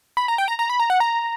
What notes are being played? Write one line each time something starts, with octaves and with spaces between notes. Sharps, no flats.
B5
A#5
G5
A#5
A#5
B5
A#5
F#5
A#5